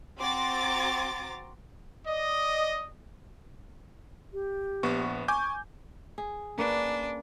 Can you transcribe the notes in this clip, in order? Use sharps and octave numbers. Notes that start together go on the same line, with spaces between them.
C4 F#4 A#5 C6 D6 A6
D5 D#5
G4
A#1 B3 C#6
G#5 C#6 D6 G6
G#4
A#3 C#4 D4 B4